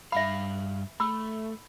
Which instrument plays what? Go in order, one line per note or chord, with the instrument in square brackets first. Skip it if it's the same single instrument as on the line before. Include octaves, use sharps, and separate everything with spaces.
[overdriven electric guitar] G2 F5 [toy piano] E5 B5
[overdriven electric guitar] A3 [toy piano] B5 E6